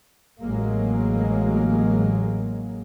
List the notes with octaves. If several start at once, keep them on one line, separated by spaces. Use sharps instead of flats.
A1 F#3 G#3 A#3